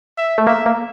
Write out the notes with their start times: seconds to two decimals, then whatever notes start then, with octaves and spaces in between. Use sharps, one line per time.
0.18 E5
0.38 A3
0.47 A#3 E5
0.66 A#3